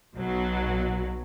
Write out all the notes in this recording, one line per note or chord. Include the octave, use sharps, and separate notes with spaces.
B1 B2 F#3